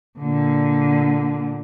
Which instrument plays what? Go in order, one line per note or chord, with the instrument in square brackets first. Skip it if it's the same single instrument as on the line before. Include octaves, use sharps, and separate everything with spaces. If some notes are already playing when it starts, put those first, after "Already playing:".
[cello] A#2 D3